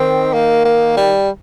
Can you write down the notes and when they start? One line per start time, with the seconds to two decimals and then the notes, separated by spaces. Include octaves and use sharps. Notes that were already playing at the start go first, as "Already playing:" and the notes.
Already playing: D#3 C4
0.33 A#3
0.65 A#3
0.97 G3